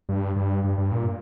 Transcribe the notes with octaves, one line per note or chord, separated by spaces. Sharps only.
G2
G2
G2
G2
A#2